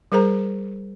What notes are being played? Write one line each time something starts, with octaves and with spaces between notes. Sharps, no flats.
G3 G#4 A#4 C5 A#5